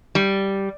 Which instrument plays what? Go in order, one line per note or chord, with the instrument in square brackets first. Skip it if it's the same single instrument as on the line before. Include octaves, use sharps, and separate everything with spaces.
[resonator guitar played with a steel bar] G3